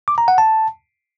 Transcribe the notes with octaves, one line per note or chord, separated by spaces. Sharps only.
D6
A#5
F#5
A5